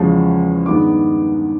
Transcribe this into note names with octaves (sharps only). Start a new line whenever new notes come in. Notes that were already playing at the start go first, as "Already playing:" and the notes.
Already playing: E2 C#3 F3 G#3
G2 D#3 G#3 B3 D6